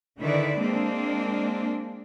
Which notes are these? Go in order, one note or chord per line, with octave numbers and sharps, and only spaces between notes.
D3 D#3 E4 B4 D5
G#3 A#3 C4 D4